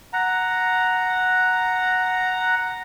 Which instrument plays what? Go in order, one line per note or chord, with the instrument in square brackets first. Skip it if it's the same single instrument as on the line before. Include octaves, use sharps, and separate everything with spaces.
[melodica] F#5 A#5